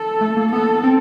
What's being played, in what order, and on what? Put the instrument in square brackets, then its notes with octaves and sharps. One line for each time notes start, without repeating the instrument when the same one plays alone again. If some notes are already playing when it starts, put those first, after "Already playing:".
Already playing: [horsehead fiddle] A4
[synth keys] A3
A#3
[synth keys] B3 [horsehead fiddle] A4
[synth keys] C4